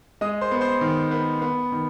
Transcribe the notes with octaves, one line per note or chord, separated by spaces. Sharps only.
G#3 D#5 D#6
C5 C6
B3
C5 C6
D#3
B3
B3
D#3